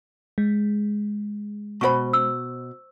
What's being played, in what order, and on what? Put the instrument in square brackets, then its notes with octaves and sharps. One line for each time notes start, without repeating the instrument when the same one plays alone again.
[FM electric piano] G#3
[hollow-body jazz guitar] B2 D5 B5 [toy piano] C5 C#6
[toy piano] E6